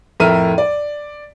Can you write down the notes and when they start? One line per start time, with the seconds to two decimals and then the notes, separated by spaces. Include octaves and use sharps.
0.20 F2 A2 A#4 E5 F6 D#7
0.58 D5